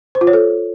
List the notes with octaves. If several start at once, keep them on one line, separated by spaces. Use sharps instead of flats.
C5
F4
C#5
A4